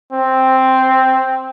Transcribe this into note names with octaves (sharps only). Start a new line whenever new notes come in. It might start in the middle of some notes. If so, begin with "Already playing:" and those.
C4